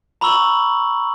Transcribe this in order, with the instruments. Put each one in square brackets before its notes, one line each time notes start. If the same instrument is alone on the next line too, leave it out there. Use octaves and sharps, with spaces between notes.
[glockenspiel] A#5 B5 C#6 E6 F#7